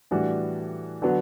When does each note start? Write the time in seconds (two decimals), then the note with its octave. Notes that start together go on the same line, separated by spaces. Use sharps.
0.11 A2 E3 G3 D4 F#4
1.02 D3 F#3 B3 F#4